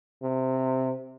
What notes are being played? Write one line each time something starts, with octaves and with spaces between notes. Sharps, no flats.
C3